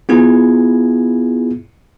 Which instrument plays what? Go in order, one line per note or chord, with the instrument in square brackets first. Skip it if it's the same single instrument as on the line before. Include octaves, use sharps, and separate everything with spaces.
[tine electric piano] B3 E4 F4 G#4 G#6